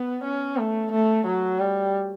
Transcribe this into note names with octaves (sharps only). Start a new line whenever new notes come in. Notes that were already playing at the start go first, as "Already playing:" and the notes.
Already playing: B3
C#4
A3
A3
F#3
G3